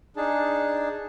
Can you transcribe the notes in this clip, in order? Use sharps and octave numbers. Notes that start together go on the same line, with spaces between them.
D4 D#4 G#4 A5